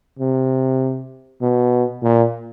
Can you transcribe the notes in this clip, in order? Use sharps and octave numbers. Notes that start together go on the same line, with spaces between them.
C3
B2
A#2